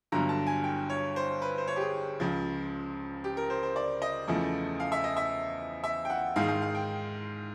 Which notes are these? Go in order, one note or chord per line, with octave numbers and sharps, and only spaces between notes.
G1 G2 D3 F#3 A#5
A5
G#5
G5
C#5
C5
B4
C5
C#5
G4
G#4
C#2 C#3 F3
G4
A#4
C5
C5
D5
D#5
E2 C#3 F3 A3
F5
E5
D#5
E5
E5
G5
F#5
G#2 D#3 G#3 F5
F5
F5
G5